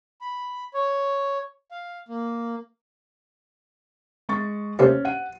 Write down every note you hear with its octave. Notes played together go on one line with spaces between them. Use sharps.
B5
C#5
F5
A#3
G#3 C#6 A6
D#2 C3 A3 C#4
F#5 D#7